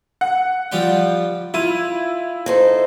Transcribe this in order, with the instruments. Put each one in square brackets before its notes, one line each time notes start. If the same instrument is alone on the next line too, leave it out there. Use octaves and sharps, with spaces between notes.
[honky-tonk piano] F#5
[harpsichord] F3 G3 G5
[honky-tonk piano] E4 D#7 [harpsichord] F4
[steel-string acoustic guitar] D#4 A4 C5